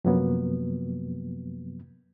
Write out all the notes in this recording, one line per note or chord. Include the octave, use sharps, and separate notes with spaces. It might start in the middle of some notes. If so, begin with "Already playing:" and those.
F#2 C3 F3 F#3 A#3 B3